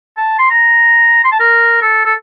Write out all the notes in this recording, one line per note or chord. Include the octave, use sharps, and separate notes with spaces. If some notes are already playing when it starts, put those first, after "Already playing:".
A5
C6
A#5
C6
A5
A#4
A4
A4